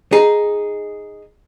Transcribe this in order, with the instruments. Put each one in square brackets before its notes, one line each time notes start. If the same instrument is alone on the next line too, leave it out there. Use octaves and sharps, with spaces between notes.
[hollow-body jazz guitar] D#4 G#4